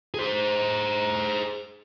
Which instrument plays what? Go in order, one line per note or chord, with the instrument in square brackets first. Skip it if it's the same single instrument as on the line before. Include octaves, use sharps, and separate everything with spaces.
[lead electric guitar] G#4 C5